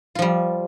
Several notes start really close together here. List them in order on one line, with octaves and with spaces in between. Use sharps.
F4 F3 G3